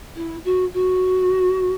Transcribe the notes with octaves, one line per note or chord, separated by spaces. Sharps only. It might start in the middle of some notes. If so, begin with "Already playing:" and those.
E4
F#4
F#4